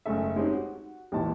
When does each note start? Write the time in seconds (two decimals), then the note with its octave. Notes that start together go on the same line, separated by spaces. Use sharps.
0.06 F#1 G#2 A3 A4 E5
0.36 G#3 C4 C#4 D#4 G4
0.52 F#4
1.12 G#1 D#2 A#2 E3 A5